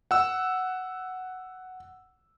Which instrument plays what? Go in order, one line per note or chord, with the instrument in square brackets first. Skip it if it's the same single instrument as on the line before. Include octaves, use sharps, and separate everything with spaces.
[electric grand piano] F#5 E6